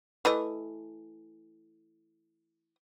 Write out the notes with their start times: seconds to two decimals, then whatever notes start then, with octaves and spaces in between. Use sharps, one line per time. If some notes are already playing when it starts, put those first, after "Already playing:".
0.25 E3 A3 D#5